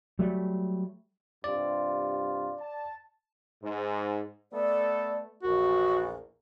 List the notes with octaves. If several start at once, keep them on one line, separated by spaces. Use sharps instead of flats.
F#3 G3 A3
G2 C3 F4 D5
A5
G#2
A3 B3 A4 D5
A#1 E2 F#4 A#4